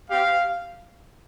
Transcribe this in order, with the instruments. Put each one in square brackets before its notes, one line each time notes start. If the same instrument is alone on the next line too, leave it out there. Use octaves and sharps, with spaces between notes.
[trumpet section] C4 G4 F5